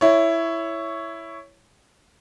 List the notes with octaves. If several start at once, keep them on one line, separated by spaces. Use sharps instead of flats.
E4 C#5